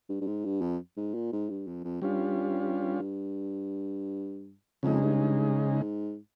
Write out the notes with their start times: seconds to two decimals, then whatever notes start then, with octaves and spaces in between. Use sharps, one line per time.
0.09 G2
0.21 G2
0.27 G#2
0.45 G2
0.61 F2
0.97 G#2
1.14 A#2
1.32 G#2
1.50 G2
1.67 F2
1.84 F2
2.02 G2 G3 C#4 F4
4.83 F2 C#3 G#3 D#4
5.01 G2
5.18 G2
5.36 G2
5.53 G#2